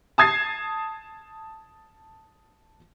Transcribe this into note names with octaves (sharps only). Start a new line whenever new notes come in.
A5 D#6 G#6 A6 C7